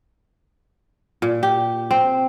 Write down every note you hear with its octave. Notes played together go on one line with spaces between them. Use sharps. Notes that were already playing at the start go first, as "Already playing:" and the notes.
A#2
G4
C4